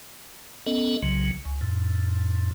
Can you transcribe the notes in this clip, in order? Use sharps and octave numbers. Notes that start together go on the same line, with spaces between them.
B3 C#4 A4 D#5
C2 C#3 F#3
C#2
F2 A2